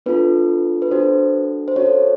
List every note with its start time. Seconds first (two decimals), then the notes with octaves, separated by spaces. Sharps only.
0.06 B3 D4 F4 A4 B4
0.82 B4
0.91 D4 F#4 A4 C5
1.68 C5
1.76 C#4 F#4 A4 C#5